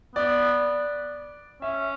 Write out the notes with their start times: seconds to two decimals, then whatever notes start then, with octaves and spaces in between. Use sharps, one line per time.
0.15 B3 D5
1.62 C#4 E5